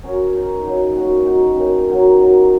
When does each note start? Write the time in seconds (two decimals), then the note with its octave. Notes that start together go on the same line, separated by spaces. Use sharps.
0.03 F#3 C#4 A#4 C#5
0.34 G#3 D#4 A#4
0.64 C#3 F#3 D#4
0.95 A#2 A#3 C#4 F#4
1.26 G#3 D#4 F#4 C#5
1.56 F#2 D#3 A#3 C#4
1.87 F#3 A#3 D#4 A#4
2.17 F#3 A#3 F#4 D#5